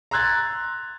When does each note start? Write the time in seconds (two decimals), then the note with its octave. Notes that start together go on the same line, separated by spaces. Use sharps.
0.11 A#5 C6 E6 F#6 G#6 A6